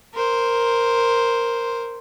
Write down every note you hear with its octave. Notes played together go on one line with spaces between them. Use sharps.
A#4 C5